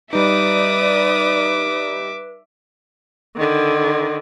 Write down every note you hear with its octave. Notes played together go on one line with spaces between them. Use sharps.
G3 D#4 B4 D5 E5 D6 D#6
D3 D#3